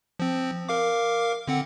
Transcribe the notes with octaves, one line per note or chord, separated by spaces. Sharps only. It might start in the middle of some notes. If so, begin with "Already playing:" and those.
F3 C4
A#4 F5 D6
D3 C4 F#5